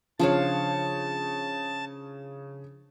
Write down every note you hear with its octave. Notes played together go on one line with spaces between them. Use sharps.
C#3 F3 D4 C#5 F5 A5